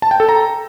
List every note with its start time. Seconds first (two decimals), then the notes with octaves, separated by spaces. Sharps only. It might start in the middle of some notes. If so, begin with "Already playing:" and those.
0.02 A5
0.11 G5
0.20 A4
0.29 A#5